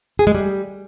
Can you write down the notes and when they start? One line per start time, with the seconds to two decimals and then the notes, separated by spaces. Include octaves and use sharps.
0.19 G#4
0.27 G#3
0.35 G3